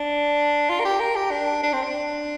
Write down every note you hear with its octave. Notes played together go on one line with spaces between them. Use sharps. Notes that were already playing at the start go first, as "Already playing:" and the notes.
Already playing: D4
F4
A#4
G4
A#4
G4
D4
D4
C4
D4